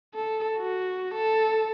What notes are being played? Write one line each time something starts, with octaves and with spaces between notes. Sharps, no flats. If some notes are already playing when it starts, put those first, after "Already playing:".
A4
F#4
A4